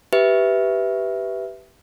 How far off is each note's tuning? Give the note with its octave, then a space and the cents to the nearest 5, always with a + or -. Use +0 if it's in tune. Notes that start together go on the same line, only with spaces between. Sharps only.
G4 -10 B4 +0 E5 +0